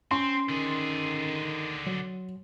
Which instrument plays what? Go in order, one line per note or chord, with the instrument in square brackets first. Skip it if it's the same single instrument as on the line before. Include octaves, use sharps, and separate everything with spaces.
[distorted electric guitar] C4 [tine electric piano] C#4 [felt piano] C6
[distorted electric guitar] D3 G#4 [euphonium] D#3
[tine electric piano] F#3